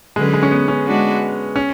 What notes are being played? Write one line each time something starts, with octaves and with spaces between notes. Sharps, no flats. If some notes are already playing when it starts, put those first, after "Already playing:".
D3 F#3 G#3 C#4 G#4 B4
G#3
C#4
B3
C#4
G#3 D4 F#4 B4
C#4